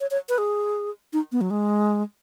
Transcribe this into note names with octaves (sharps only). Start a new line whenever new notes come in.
C#5
C#5
B4
G#4
D#4
B3
F#3
G#3